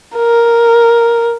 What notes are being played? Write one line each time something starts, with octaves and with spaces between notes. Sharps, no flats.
A#4